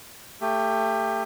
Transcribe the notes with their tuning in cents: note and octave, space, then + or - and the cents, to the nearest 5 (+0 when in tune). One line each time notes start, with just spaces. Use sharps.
A3 +25 G4 +20